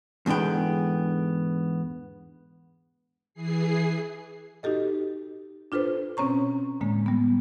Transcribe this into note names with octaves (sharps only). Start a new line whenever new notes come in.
E2 G#2 D3 B3 G5
E3 G#4 C7
D#4 F#4 G4 A4 D#5
D4 F4 A4 B4 C5
B2 C4 C#4 C#5 A#5 C#6
A2 D3 G#3 A#3
G3 B3